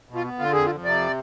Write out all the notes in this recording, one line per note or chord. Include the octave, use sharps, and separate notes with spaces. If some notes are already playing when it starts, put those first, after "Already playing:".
B2
F4
B3
D3 F4
F2 G#4
F4
F2
C3 D5